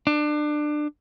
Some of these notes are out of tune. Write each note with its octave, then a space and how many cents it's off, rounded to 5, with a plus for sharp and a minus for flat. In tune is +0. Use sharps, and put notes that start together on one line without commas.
D4 +25